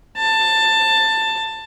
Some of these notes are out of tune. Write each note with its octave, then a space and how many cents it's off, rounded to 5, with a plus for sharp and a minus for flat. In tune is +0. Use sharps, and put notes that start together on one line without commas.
A5 +15